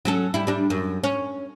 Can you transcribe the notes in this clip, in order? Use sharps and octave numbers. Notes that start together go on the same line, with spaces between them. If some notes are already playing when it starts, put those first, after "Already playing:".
F#3 C#4 A4
G3 E4
G3 D4
F#2
C#4